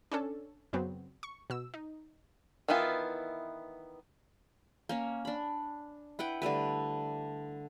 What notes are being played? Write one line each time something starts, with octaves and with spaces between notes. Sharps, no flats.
C#4 D4 A4
F#2 C#3 F#3 B3 C4
C#6
B2 E6
D#4
D#3 E3 B3 E4 F4
A#3 C#4 C#5
D4 B5
E4 B4 F#5 G5
D3 G3 A3 B4